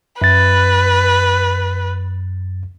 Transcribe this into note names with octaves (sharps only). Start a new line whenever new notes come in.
F#2 B4 A6